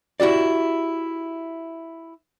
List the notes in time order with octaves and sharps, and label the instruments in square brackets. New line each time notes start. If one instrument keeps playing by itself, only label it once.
[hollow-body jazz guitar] E4 F#4 G4 D5